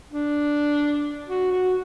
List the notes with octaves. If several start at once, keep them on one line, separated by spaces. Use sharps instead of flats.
D4
F#4
F#4